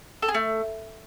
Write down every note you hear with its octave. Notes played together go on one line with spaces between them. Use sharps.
A4
G#4
A3